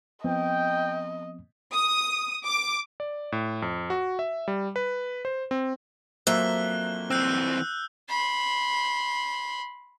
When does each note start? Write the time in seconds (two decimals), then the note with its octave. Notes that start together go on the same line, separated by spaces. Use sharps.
0.24 F3 B3 C4 D#5 G5
1.73 D#6
2.45 D6
3.00 D5
3.32 A2
3.62 F2
3.90 F#4
4.19 E5
4.48 G3
4.76 B4
5.25 C5
5.51 C4
6.27 F2 F#3 A#3 C5 E5 F#6 G7
7.10 E3 C4 E6 F#6 G6
8.09 B5 C6